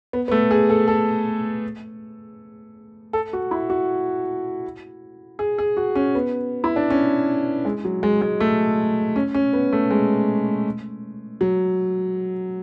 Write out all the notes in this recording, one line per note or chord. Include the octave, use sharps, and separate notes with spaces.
B3
B3
A3
G#4
A4
A4
A4
F#4
E4
F#4
G#4
G#4
F#4
C#4
B3
E4
D4
C#4
G#3
F#3
G#3
G#3
A3
C#4
C#4
B3
A3
G#3
F#3